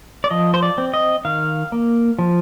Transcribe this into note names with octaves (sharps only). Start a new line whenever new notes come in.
D5
F3 D#5
C5
D5
C4
D#5
D#3 F5
A#3
F3